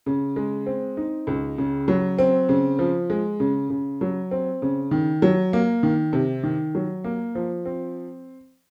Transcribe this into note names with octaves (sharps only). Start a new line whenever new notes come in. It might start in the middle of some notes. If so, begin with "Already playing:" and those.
C#3
G#3
C4
D#4
C#2
C#3
F#3
C4
C#3
F3
G#3
C#3
C#3
F#3
C4
C#3
D#3
F#3
A#3
D#3
C3
D#3
F#3
A#3
F3
C4